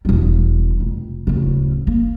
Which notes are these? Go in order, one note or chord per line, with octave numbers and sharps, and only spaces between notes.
E1 G3
F1
D1 C#3
A#3